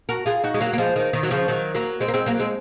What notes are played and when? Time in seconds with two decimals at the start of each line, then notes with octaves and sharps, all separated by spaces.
0.09 F#4 A#4
0.26 F4 G#4
0.44 D#4 F#4
0.54 G#3
0.61 F#3 A#3
0.73 A#3
0.78 F3 G#3
0.96 D#3
1.13 D#3
1.23 F#3
1.30 C#3 F3
1.48 D#3 F#3
1.74 F#3 A#3
2.01 G#3 C4
2.08 A#3
2.14 G#3 C4
2.26 F#3 A#3
2.40 G#3 C4